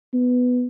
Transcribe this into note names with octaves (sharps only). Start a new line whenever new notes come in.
B3